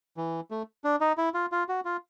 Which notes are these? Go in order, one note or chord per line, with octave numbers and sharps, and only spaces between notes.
E3
A3
D4
D#4
E4
F4
F4
F#4
F4